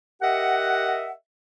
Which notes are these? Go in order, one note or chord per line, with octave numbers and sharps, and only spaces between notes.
G4 A#4 D#5 E5 F#5